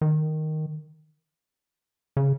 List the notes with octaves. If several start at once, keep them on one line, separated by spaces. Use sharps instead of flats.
D#3
C#3